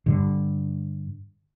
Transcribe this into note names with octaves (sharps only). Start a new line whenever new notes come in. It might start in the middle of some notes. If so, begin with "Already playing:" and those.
G2 D3